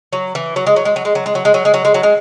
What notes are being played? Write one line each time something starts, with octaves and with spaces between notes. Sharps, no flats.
F#3
E3
F#3
G#3
F#3
G#3
F#3
G#3
F#3
G#3
F#3
G#3
F#3
G#3
F#3
G#3
F#3
G#3